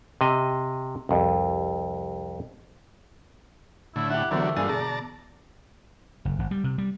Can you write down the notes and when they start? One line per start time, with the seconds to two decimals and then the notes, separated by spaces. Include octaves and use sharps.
0.21 C3 D#5
1.09 C2 F2
3.96 A2 D3 E4
4.10 E4 G4 F#5
4.31 D3 E3 F#3 A3 B3 D4
4.57 G2 D3 A#3 F4 G#4 D5 G#5
4.69 B2 G#4 D5 A5 A#5
6.25 F#1
6.39 G#1
6.51 G3
6.64 C3
6.78 G3